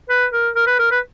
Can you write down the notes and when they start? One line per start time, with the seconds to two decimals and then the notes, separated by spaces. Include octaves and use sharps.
0.09 B4
0.33 A#4
0.55 A#4
0.67 B4
0.79 A#4
0.91 B4